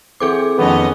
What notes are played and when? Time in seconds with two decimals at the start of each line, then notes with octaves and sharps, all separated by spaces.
0.20 E3 C4 G#4 A4 D6
0.58 F2 D#3 B3 C#4 D#5